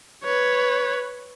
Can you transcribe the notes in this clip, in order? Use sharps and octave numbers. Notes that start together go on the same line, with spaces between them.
B4 C#5